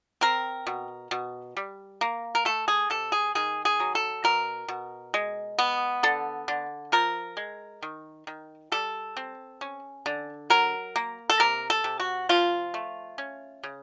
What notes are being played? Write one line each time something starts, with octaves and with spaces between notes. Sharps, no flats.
C4 A#4
B2
B2
G3
A#3
A#4
A3 A4
G#4
C3 A4
G#4
D#3 G#4
G#4
F#3
A4
B2 A#4
B2
G#3
B3
D3 A4
D3
F3 A#4
G#3
D#3
D#3
G3 A4
C4
C#4
D3
F#3 A#4
A#3
A4
C3 A#4
A4
C3
F#4
F3 F4
A3
C#4
C#3